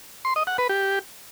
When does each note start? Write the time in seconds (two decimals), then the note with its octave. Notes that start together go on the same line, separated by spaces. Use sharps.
0.25 C6
0.36 D#5
0.47 F#5
0.58 B4
0.69 G4